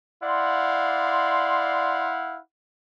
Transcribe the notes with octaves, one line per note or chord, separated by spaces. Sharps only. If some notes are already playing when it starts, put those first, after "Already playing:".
E4 D5 F5 F#5 C6